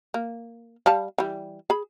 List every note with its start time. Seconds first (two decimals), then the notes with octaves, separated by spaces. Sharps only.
0.14 A#3
0.86 G3 F5 A5
1.18 E3 G3
1.70 G#4 B5